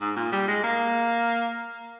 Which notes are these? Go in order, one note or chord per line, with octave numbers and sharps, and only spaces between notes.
G#2
A#2
G3
G#3
A#3